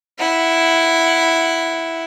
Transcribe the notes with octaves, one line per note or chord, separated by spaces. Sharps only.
E4 F#5